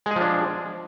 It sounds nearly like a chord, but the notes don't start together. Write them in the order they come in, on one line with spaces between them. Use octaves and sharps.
G#3 G#4 F3 D4